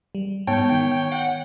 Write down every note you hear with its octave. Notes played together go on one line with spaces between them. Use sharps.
G3
G#2 B3 C#5 G5
D#3
F#5